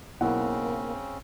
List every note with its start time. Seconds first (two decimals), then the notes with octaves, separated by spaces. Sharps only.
0.21 B1 C#3 A#3 C4 C#4 E4 F#5